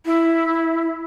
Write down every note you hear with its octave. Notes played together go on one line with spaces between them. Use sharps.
E4